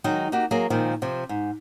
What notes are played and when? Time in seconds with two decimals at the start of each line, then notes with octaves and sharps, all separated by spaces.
0.04 D#3 F#3 G#3 D#4
0.32 A#3 D#4 F#4 G4
0.51 F#3 A#3 G#4
0.70 A#2 D#3 F3 G#3
1.02 C3 F3
1.29 G#2